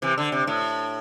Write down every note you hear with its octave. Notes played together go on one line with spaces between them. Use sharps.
C3 E3
D3
C3
A2